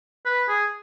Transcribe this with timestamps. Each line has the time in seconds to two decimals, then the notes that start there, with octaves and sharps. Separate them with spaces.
0.26 B4
0.48 G#4